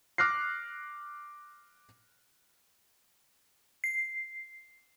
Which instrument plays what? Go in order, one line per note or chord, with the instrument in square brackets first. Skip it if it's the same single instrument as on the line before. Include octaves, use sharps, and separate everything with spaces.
[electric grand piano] D6 F6 F#6 A#6 C7
[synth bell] C7